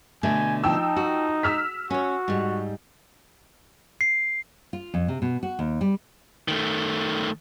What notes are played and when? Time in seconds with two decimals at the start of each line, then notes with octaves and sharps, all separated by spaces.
0.23 B2 D3 A3 G#5
0.64 F3 D#4 G5 E6
0.96 F#4
1.43 E6 F6 B6
1.90 C#4 F#4 C#5
2.28 G#2 G3
4.01 C7
4.73 F4
4.94 F2
5.08 C3
5.22 B2
5.43 F#4
5.59 D#2
5.81 G3
6.48 D#3 A3